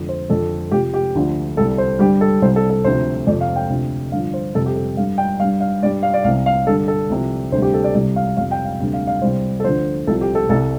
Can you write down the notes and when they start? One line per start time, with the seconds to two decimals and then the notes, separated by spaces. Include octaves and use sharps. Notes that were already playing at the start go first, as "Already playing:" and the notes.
Already playing: F2 D3 F3
0.09 C5
0.29 F2 D3 F3 A4
0.71 F2 C3 F3 G4
0.94 G4
1.15 D2 D3 F3
1.57 C2 C3 G3 A4
1.78 C5
1.99 G2 D3 G3 G4
2.21 A4
2.42 C2 C3 G3 C5
2.56 A4
2.70 A4
2.84 D2 C3 F3 C5
3.27 F2 C3 F3 D5
3.41 F5
3.56 G5
3.69 D2 C3 F3
4.12 G2 D3 F3 F5
4.34 C5
4.54 F2 C3 G3 A4
4.66 G4
4.76 A4
4.97 G2 G3 F5
5.18 G5
5.40 G3 F5
5.44 G2
5.60 F5
5.82 G2 G3 D5
6.03 F5
6.14 D5
6.24 C2 C3 G3 F5
6.46 F5
6.67 G2 D3 G3 A4
6.88 A4
7.10 C2 C3 F3
7.52 D2 C3 G3 C5
7.62 G4
7.74 A4
7.84 D5
7.94 C2 C3 G3 D5
8.16 F5
8.37 F2 C3 G3 F5
8.51 G5
8.65 F5
8.80 D2 C3 G3
8.93 F5
9.07 F5
9.22 C2 C3 G3 C5
9.60 A4
9.64 D2 D3 F3 C5
10.07 C2 C3 F3 A4
10.21 G4
10.35 A4
10.49 C2 C3 G3 A4